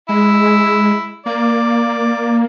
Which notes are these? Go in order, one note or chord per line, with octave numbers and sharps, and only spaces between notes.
G#3 E4
A#3 D5